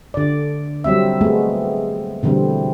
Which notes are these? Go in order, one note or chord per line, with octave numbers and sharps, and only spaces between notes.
D3 D5
F#3 G3 C4 E5
G#3 A3 B3 C4
B2 D3 E3 G3 C4